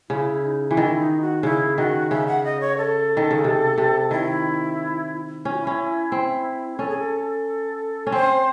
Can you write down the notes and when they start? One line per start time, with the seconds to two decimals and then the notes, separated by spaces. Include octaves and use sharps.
0.10 C#3 E4
0.43 D#4
0.70 E3 F#4
0.77 D#3 E4
0.99 D#4
1.21 F#4
1.43 C#3 E4
1.78 D#3 F#4
2.10 C#3 E5
2.27 F#5
2.44 D#5
2.61 C#5
2.78 A4
3.17 D#3
3.31 C#3
3.44 C3
3.78 C3
4.11 D#3 E4
5.44 C#4 E4
5.52 F#4
5.59 E4
5.67 C#4
6.12 C4
6.78 C#4 A4
6.89 G#4
6.98 A4
8.07 C#4
8.12 C4 C5